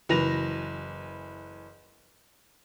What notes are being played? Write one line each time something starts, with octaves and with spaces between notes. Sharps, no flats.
F#1 E3 B4 A#6 F7